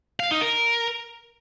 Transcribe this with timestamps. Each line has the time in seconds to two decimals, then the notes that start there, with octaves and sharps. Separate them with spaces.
0.20 F5
0.31 D#4
0.42 A#4